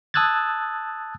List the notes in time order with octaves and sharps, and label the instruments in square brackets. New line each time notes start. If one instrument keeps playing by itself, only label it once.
[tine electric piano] A5 D#6 E6 F#6 G#6 A6